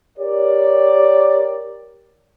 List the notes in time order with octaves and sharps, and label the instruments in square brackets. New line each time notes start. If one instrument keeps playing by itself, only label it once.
[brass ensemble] G4 A#4 C#5 D5